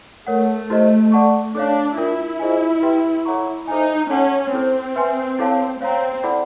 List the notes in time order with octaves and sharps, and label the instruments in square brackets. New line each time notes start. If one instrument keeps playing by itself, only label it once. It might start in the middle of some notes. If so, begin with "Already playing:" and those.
[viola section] A3 [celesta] A#4 C#5 F#5
[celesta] E4 G4 C5 D#5
A4 D5 F#5 A5 C#6
[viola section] D4 [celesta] A4 C#5 F5
[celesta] D4 F4 A#4 [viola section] E4
[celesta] F4 G#4 C5 D#5 G#5
G4 B4 E5 G5 C6
A4 C#5 F#5 A#5 C#6
[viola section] D#4 [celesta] A4 C5 E5 G#5
[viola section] C#4 [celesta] A4 C#5 F#5 A5
[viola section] C4 [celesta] E4 A4 C5
[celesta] B4 E5 G#5 C6
E4 A4 C#5 F5 A5
[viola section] C4 [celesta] C#5 F5 A#5
[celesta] E4 A4 D5 F#5 B5